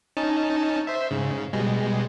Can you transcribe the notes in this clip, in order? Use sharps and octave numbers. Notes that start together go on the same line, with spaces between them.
C#4 D#4 A5
C5 E5
G#2 C#3
B2 G3 G#3